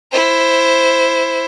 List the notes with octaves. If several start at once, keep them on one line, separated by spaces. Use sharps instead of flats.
E4 C5